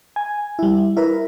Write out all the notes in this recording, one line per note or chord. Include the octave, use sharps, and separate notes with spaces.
G#5
G3 E4
E4 A#4 B4